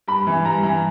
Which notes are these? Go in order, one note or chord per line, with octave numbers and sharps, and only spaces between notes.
G2 B5
E3
G2 A#5
E3